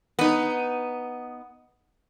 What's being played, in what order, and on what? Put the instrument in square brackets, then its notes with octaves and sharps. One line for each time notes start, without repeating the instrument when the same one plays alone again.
[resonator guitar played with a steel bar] B3 D#4